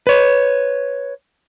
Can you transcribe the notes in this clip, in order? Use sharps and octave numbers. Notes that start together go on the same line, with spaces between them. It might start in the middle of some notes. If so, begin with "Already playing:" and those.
B4 C#5